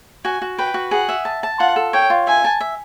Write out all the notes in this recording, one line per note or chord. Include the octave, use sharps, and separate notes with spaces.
F#4 G#5
F#4
B4 G5
F#4
G#4 F#5
E5
A5
A5
F4 F#5
A4
C#5 G5
F4
E5 G#5
A5
E5